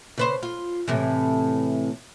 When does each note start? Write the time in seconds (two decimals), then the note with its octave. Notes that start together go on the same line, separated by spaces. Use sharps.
0.18 C#3 B4 C5
0.43 F4
0.88 A2 C3 E3